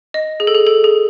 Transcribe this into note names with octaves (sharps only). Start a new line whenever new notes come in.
D#5
G#4
A4
G#4
A4
G#4